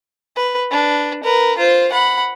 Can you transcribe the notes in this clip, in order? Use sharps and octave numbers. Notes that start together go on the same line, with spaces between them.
B4
D4 B4
A#4 B4
F4 C5
F#5 B5